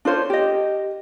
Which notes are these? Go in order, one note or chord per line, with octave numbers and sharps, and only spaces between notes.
D4 F4 C5 C#5
G4 D#5